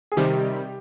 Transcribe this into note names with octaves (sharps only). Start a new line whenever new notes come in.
G#4
C3 D#3 G3 G4